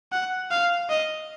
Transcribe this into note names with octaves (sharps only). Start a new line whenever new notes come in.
F#5
F5
D#5